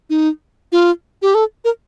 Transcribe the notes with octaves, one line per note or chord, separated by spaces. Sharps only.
D#4
F4
G4
A4
A#4